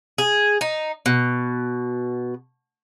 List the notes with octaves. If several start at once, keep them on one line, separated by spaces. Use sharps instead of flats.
G#4
D#4
B2